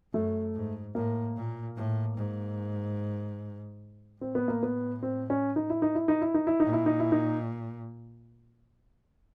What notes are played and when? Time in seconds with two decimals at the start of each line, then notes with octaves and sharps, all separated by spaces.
0.13 F#2 A3
0.55 G#2
0.95 A2 A#3
1.36 A#2
1.77 A2
2.17 G#2
4.21 A2 C4
4.35 B3
4.48 A#3
4.63 B3
5.03 C4
5.30 C#4
5.56 D#4
5.70 E4
5.82 D#4
5.95 E4
6.08 D#4
6.21 E4
6.34 D#4
6.47 E4
6.60 D#4
6.65 A#2
6.73 E4
6.86 D#4
7.00 E4
7.12 D#4